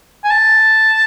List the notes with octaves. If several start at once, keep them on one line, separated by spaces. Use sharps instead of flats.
G#5
A5